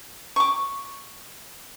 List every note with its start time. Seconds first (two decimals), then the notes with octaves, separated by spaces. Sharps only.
0.36 C#6 D6